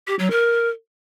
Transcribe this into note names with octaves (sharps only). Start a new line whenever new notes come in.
G4
F#3
A#4